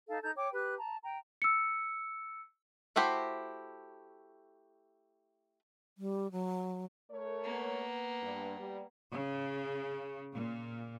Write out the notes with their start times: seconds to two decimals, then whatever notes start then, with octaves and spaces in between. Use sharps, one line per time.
0.09 D#4 A4 F5
0.23 D#4 A4 A#5 G6
0.36 C#5 G5 D6
0.54 G4 B4 F#6
0.78 A5 A#5
1.04 G5 A#5
1.42 E6 C#7
2.96 A3 E4 F#4 G4 C5
5.98 G3
6.32 F#3
7.11 A3 A#4 C#5
7.44 A#3 B3
8.23 G2
8.59 G3
9.12 C#3
10.33 A#2